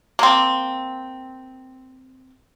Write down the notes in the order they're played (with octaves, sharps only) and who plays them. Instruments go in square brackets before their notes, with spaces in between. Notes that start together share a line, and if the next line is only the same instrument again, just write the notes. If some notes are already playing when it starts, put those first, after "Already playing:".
[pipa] A#3 C4